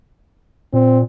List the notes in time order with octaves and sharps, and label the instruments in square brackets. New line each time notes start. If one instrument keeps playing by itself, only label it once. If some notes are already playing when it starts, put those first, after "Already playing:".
[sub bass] A#2 [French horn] C4